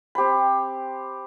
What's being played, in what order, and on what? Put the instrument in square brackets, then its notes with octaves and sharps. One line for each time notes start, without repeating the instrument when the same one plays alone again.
[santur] C4 G4 C5 B5